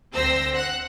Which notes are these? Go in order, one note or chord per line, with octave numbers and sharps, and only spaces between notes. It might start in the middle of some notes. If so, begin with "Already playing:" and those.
D2 C4 C5 E6 A#6
F#5 F#6